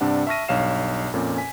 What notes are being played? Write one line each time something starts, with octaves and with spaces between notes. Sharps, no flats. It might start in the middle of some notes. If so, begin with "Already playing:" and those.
G2 C3 D4 F#5
E5 A5 C#6 F6 A#6 D#7
B1 G2 C#5 F5 C7 E7
F2 A#2 C#4
G#5 B6